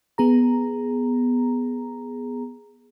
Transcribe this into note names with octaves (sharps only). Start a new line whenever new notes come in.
B3 G#4 A#5